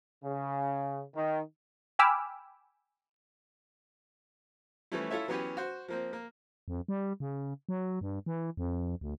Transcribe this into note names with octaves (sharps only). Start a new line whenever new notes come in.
C#3
D#3
G5 G#5 B5 D6 E6 F6
E3 F3 G3 A3 C#4 E4
E4 F4 A4 C#5 E5
E3 F#3 B3 C#4 G4 B4
F#4 C5
F3 A#3 C4
A#3
F2
G3
C#3
F#3
G2
E3
F2
D2